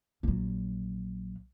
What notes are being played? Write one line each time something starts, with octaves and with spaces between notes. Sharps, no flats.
A#1 F#3